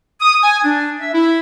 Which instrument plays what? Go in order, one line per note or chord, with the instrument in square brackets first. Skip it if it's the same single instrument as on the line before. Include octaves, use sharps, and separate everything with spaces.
[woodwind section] D#6
G#5
D4
E5
E4